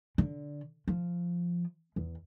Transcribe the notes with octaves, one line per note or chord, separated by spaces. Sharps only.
D3
F3
E2